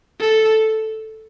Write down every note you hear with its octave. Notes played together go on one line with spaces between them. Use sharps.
A4